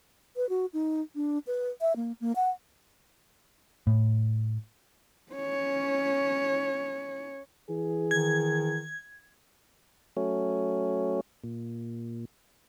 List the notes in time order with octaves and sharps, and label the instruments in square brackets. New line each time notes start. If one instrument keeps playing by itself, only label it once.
[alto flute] B4
F#4
D#4
D4
B4
E5
A#3
A#3
F#5
[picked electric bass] A2
[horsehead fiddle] C#4 C#5
[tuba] E3 [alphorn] G#4
[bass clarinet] D#3 [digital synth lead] G#6
[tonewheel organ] F#3 A3 C#4
A#2